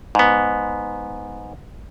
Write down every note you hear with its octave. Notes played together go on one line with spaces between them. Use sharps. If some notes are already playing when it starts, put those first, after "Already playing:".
G#2 B3